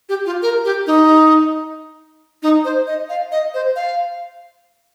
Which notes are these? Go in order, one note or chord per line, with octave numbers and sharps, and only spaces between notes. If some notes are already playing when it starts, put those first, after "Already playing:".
G4
F4
A#4
G4
D#4
D#4
C5
D#5
F5
D#5
C5
F5